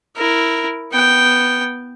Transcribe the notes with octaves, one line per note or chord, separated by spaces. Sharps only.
E4 A#4
B3 G5